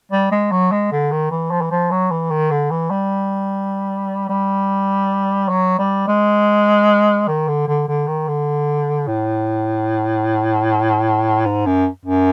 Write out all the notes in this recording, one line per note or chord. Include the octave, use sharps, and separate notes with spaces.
G3
G#3
F#3
G#3
D3
D#3
E3
F3
E3
F3
F#3
E3
D#3
D3
E3
G3
G3
F#3
G3
G#3
D#3
D3
D3
D3
D#3
D3
A2
G#2
F#2
F#2